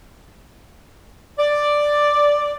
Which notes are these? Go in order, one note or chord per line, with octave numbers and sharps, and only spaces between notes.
D5